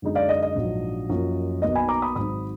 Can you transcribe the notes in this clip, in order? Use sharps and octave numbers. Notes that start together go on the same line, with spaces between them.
F#2 D3 G#3 D#4
D5 F5
D#5
D#5
A#1 G#2 F#3 D4
F#2 F3 A#3
B1 B2 A#3 D#4 D#5
G#5 B5
A#5 D6
B5 D#6
G#1 G#2 F#3 B5 D#6